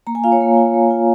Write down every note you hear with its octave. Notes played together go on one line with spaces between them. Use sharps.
A#3 A#5
G#5
F4 F5
C#5
A#3
F4
A#3
F4